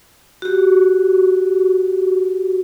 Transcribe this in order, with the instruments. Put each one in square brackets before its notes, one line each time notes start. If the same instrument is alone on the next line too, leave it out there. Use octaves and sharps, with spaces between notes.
[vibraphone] F#4 G4